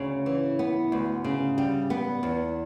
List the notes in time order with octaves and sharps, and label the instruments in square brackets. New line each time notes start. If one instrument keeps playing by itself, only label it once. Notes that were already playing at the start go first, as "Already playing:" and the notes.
Already playing: [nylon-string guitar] D2 C#3
E3
B3
D2
C#3
G3
B3
E2